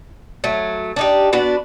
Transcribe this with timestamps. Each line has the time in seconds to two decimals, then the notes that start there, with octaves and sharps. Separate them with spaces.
0.44 F#3 A3
0.96 D4 D#4 G4
1.33 B3 D4 F#4 B4